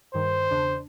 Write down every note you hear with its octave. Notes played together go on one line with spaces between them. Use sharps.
G2 D#3 C5
E2 C#3 D4